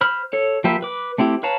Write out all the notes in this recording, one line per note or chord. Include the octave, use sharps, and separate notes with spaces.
C5 B5 F6
A4 C#5
F3 A#3 G4 B4 E5
B4 D6
A3 C4 E4 G4
B4 C#5 F5 A5 A#5